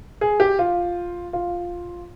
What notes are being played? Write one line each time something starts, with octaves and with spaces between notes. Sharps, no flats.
G#4
G4
F4
F4